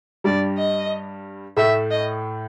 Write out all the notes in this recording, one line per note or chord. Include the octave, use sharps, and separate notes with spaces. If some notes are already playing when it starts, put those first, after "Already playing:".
G2 G3 D5
D#5
A2 A3 E5
D#5